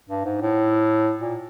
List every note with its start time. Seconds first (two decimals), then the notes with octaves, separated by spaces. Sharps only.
0.09 G2
0.25 G#2
0.41 A2
1.20 A#2